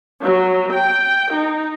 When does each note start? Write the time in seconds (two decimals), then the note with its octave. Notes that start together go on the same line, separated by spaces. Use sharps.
0.21 F#3
0.72 G5
1.32 D#4